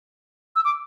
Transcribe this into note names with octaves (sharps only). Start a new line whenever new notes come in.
E6
D6